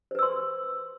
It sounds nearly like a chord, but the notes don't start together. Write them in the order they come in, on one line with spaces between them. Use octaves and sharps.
C5 B4 E6 C6